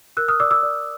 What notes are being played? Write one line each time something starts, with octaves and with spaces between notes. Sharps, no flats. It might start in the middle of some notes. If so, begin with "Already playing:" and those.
A#4 E6 F#6
D#6 F6
D5 D6 E6
D6 E6
D5